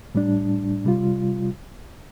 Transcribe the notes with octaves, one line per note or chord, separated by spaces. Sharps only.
A2 G3 D4
C3 G3 F4